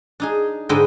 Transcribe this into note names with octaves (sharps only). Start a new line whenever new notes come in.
D4 D#4 G#4
G#2 D3 G#3 B4 D#5 G5